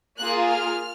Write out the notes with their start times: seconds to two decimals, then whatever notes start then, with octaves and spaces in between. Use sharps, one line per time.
0.19 A#3 F4 G#4 F#6
0.49 F6